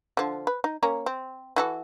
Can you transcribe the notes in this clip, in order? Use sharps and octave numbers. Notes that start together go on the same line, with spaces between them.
D3 F3
B4
D#4
A#3 C#4 A#5
C4
E3 F#4 A4